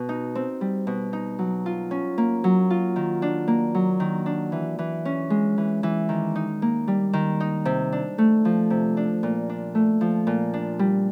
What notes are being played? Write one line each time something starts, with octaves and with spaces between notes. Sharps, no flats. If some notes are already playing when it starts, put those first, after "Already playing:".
Already playing: B2
D#4
C4
G3
B2
D#4
F#3
F4
C#4
A#3
F#3
F4
D#3
D4
A#3
F#3
D#3
D4
E3
E3
C#4
G#3
E3
E3
D#3
D#4
A#3
G3
D#3
D#4
C3
D4
A3
F3
C3
D4
A#2
D4
A3
F3
A#2
D4
G3